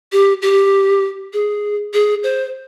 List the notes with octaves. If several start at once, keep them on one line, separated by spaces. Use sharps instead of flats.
G4
G4
G#4
G#4
C5